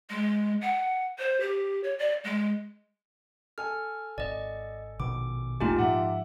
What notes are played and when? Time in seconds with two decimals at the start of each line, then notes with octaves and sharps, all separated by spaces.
0.10 G#3
0.61 F#5
1.19 C5
1.41 G4
1.84 C#5
1.99 D5
2.24 G#3
3.58 A4 G#5 F6
4.18 G#1 D5 D#5
5.00 A#1 B2 D#3 D6
5.61 E1 A1 A#2 A3 D#4 F4 G4 G#5
5.76 G#2 F3 E5 F#5 D6